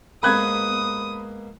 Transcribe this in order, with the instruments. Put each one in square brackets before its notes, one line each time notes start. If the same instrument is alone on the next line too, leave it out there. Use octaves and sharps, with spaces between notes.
[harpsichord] G#2 A#3 B3 [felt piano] B5 F#6 G#6 [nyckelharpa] D#6